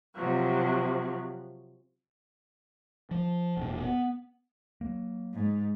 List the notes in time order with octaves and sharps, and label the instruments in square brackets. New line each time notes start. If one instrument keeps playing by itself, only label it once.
[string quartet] C3 F3 F#3
[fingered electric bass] F3
E1 A#2
B3
[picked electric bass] F#3 A#3
[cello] G#2